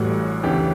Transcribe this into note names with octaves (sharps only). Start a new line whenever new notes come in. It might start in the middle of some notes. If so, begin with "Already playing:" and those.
Already playing: A1 A2 E3 G3 F#4
D2 C#3 E3 B3 G4